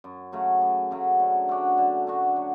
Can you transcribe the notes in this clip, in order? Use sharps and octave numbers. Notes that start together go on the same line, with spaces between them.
F#2
C#3 F#3 A3
F#2
C#3 F#3 A3
D3
A3 D4 F#4
D3
A3 D4 F#4
F#3